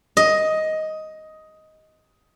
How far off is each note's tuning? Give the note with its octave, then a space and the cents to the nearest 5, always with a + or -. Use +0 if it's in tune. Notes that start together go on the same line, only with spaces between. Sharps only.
D#5 +10